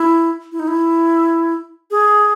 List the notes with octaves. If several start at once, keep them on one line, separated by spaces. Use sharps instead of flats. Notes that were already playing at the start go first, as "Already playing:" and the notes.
Already playing: E4
E4
D#4
E4
G#4